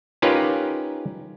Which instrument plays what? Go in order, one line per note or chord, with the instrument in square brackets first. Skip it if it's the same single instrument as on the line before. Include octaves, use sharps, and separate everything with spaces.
[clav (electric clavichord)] C#4 D#4 F4 G4 A#4 B4